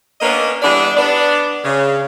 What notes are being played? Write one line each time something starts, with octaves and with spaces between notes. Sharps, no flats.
A#3 B3 C#4 D4 D#5
E3 G3 B3 D4
B3 D4
C#3